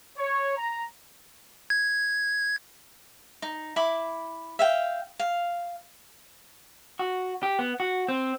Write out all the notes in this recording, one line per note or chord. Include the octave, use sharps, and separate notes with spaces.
C#5
A#5
G#6
D#4
E4 B5 D6
E5 F5 G5
F5
F#4
G4
B3
F#4
C4